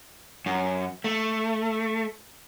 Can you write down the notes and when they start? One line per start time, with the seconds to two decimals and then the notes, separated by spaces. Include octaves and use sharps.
0.46 F#2
1.04 A3